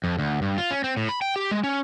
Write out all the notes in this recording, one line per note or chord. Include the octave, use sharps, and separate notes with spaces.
F2
D2
G2
F4
C#4
C4
A2
B5
G5
G4
G#3
C#4